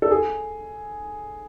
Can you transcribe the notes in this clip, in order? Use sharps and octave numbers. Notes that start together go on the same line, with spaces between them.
A4
G#4